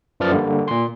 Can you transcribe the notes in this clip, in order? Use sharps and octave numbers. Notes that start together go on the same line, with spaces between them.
F#2 F3 B4 D5 F6 A6
D3 G3 A#3
A#2 C6